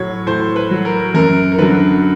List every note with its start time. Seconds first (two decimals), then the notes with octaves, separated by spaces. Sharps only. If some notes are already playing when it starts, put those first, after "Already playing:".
Already playing: A2 F#3 C#5
0.26 A2 C5
0.56 B4
0.71 F#3
0.85 A#4
1.14 F#2 A#4
1.52 A#4
1.58 D3 F#3 B4